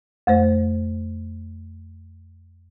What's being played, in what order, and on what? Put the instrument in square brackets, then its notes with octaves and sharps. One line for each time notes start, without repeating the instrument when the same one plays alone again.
[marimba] F2 A3 C5